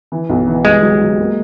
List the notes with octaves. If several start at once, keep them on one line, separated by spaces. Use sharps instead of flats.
E3
B1
E3
C2 G#3
F#3
F#3
A#3